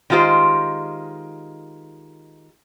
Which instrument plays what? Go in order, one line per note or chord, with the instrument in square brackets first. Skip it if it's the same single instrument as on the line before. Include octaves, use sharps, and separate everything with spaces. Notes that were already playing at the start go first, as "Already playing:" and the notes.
[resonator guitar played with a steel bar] D#3 G#3 F4 G4 C5